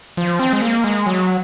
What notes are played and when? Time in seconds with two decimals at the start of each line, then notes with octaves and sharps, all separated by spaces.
0.17 F3
0.40 C4
0.53 G#3
0.62 A#3
0.84 G#3
1.06 F#3